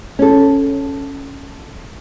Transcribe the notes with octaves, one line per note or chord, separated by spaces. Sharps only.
C#4 A4